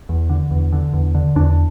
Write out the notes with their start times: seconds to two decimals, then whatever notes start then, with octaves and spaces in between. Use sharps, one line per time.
0.09 E2
0.30 D3
0.51 E2
0.73 D3
0.93 E2
1.15 D3
1.36 E2 D4